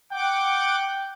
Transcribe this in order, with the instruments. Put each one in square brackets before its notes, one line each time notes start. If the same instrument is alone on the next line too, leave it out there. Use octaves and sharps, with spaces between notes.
[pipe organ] F#5 D6 [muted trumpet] G5